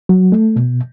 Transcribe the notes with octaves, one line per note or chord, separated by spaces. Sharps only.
F#3
A3
B2